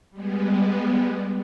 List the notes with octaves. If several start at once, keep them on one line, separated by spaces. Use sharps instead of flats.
G3 G#3 B3